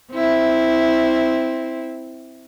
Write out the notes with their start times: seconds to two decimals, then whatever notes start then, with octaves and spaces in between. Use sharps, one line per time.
0.12 C4 E4